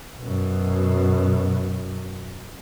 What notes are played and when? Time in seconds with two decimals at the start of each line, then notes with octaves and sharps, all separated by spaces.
0.20 F#2 B2